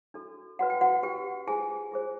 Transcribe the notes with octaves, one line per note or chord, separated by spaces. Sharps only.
D4 F#4 A4
C#4 F#4 B4 F#5
G5
F#4 F#5
C#4 F#4 G4 B4 G5
F4 G#4 C5 G#5
F4 G#4 C5